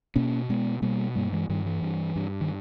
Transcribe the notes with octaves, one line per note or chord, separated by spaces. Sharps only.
B2 A#3 C#4
B2 G#3 B3
B2 G3 A#3
G2 G3 A#3
E3 G#3
G2 D#3 G3
E3
G2
G2
D#3